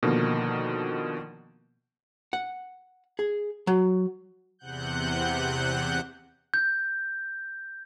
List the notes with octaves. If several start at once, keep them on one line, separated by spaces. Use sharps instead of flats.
B2 D3 D#3 F3 A#3
F#5
G#4
F#3
E2 C3 F#5 F#6 G6
G6